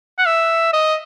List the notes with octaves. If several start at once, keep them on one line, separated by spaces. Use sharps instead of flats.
F#5
E5
D#5